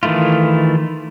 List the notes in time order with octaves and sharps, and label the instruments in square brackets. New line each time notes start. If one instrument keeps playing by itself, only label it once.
[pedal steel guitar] D#3 E3 A3 E4 F4